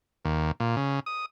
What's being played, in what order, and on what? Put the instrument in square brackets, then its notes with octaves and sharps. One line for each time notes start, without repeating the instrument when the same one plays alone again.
[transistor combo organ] D#2
A#2
C#3
D#6